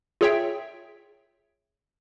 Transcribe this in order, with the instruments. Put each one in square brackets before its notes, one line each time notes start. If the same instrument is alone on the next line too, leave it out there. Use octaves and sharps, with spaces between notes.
[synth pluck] F4 G#4 C#5 E5 G5